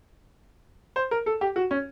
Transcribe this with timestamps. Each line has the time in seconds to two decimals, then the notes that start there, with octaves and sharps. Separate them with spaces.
0.96 C5
1.11 A#4
1.26 A4
1.41 G4
1.56 F#4
1.71 C#4